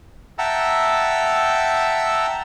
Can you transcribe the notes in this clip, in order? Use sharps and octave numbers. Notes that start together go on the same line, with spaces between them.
E5 F#5 G5 A5 A#5 E6